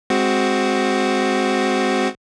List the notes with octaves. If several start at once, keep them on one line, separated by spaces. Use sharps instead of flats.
G#3 C4 F#4